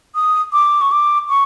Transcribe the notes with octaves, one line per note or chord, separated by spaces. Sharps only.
D#6
D6
C#6
D6
C#6